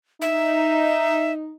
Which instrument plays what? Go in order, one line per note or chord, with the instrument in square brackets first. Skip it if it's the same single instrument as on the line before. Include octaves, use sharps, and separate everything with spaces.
[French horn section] D#4 [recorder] E5